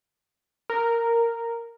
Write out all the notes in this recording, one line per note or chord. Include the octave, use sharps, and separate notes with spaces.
A#4